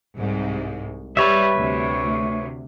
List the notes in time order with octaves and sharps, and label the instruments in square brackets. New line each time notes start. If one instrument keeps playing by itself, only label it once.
[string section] C2 G#2
[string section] G3 [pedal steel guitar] B4 C#5 E5
[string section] D2 C3